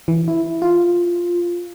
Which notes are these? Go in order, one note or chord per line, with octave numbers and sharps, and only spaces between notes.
E3
E4
F4